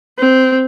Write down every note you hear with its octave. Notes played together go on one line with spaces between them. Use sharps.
C4